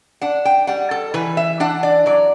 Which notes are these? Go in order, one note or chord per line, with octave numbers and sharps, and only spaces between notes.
D4 F#5
G5
G3 F#5
A4
E3 B4
E5
D4 F#5
D5
F#3 D5